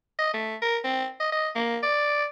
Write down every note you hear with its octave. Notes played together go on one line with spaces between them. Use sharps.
D#5
A3
A#4
C4
D#5
D#5
A#3
D5